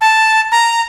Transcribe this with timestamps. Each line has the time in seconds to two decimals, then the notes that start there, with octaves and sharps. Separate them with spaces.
0.01 A5
0.52 A#5